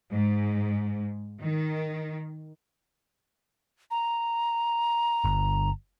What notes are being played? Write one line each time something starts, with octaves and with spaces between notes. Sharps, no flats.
G#2
D#3
A#5
G1